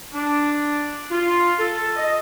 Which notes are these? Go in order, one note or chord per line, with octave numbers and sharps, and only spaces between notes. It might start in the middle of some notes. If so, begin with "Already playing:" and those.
D4
F4
A4
D#5